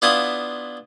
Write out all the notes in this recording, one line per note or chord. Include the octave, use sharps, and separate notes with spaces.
B3 D4 E4 F4 B5 D#6